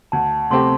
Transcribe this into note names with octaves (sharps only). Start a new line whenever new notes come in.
D2 A5
C3 A3 C4 G4 C6